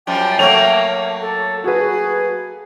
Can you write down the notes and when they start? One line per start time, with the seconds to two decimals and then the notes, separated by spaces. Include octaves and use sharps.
0.07 F#2 F3 G3 G5
0.39 F#3 A3 A#3 C#5 F7
1.21 A4
1.64 F#4 G#4 B4